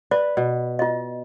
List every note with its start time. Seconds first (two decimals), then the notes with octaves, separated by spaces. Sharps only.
0.11 B4 D5
0.37 B2
0.79 F4 D#5